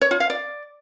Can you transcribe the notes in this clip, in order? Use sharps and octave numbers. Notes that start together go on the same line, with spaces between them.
C#5
F4
F5
D5